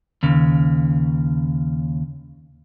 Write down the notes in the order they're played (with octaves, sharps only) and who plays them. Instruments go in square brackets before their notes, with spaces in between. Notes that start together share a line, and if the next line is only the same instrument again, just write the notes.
[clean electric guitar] D#2 C#3